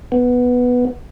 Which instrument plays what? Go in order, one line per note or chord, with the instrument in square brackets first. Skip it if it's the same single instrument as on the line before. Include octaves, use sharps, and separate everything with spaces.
[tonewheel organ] B3